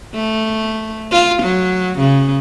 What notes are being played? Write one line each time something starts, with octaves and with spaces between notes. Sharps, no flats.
A3
F4
F#3
C#3